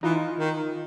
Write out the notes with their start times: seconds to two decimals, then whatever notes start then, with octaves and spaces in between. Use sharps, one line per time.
0.03 E3 D#4 F4
0.39 D#3